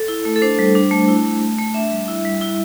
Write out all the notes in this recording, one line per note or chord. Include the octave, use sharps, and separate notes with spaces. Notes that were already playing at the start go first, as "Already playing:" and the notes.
Already playing: A4
E4
A3
A4
D4 C5
G3
D4
A3
E4
A3
A3
A3
D4 E5
G3
E4
G3
E4